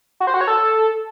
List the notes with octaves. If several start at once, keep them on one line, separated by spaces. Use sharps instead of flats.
F#4
C5
F#4
C#5
A4